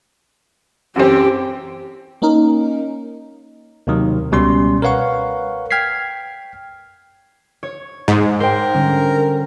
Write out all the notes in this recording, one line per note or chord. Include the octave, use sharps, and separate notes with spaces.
F#2 E3 C4 G4
A#3 C#4 D#4 A#4
D#2 C3 D#3 F#3
C#2 B2 G3 C#4 C6
A#4 B4 C#5 F5 F#5 C#6
G5 F6 G#6 B6 C7
C#5
G#2
A#4 C5 G5
D3 G3 C#4